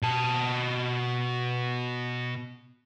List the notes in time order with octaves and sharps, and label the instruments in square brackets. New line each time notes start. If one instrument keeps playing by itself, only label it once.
[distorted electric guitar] B2 A5